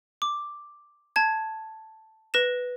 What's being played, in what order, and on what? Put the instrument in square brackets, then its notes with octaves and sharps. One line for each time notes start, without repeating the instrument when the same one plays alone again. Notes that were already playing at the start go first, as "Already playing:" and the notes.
[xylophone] D6
A5 G#6
B4 A#6 E7